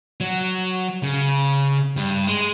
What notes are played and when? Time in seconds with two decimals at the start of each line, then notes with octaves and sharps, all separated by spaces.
0.21 F#3
1.02 C#3
1.96 G2
2.27 G#3